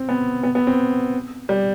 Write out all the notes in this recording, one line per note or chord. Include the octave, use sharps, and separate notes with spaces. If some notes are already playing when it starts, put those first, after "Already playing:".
Already playing: C4
B3
B3
B3
C4
G3